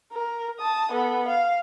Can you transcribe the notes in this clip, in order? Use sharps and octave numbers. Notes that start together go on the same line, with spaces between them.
A#4
A5 D#6
B3 A4
F5